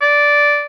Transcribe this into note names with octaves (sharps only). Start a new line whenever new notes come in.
D5